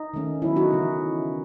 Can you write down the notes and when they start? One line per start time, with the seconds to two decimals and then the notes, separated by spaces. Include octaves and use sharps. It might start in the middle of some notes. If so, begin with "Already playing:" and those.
Already playing: D#4
0.14 D#3 A3 C#4
0.42 D#3 F#3 B3 E4
0.56 D#4 F#4
0.70 C#3 E3 A3 C#4